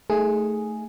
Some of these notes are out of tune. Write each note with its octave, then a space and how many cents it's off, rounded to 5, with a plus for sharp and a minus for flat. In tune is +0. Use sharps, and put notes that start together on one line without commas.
A3 +0 D#4 +0 G#4 +0